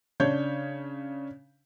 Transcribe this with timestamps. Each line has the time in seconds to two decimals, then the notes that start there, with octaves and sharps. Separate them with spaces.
0.20 C#3 D4 C#5 G6